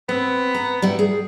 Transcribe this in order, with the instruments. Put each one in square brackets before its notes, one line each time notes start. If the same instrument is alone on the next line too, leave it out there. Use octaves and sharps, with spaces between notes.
[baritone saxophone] B3 [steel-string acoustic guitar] C4
[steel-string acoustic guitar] A#5
G3 E4 F#5
G#4